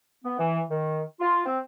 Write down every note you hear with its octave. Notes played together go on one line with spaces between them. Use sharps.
B3
E3
D#3
F4
C4